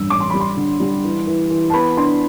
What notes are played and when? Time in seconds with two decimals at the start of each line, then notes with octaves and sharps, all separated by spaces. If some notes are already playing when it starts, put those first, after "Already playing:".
Already playing: A1 G2 E6
0.10 A1 D6
0.20 C6
0.30 G3 B5
0.40 C6
0.57 D3
0.80 G3
1.04 E3
1.27 E3
1.51 E3
1.70 A5
1.73 B3 B5
1.97 D4 C6